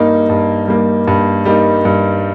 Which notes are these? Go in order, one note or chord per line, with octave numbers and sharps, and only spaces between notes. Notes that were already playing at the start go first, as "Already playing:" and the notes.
Already playing: G2 G3 A#3 D#4
G2
G3 A#3 D#4
G2
G3 A#3 D#4
G2